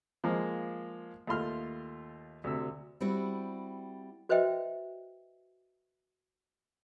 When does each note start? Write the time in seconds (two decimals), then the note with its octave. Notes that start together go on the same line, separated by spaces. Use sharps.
0.24 F3 G#3 A#3
1.27 D#2 A3 F4 C6 F6
2.44 D2 C3 E6
3.01 G3 C4 E4 F#4
4.29 F#4 B4 C5 D#5 E5 G5